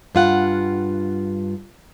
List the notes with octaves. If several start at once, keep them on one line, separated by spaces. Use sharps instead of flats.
G2 F4 F#5